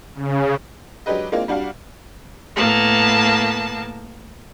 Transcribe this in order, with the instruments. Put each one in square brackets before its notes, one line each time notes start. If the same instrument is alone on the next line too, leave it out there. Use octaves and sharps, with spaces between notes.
[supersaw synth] C#3
[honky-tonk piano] F#3 G#3 D4 G4 B4 D#5
G#3 A#3 C4 D4 F4
G3 D4 F#4 F5
[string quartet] A2 A#3 B3 A5